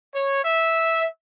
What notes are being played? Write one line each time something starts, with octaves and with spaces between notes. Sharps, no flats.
C#5
E5